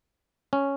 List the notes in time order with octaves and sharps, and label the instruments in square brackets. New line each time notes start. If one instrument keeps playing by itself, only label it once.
[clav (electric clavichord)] C#4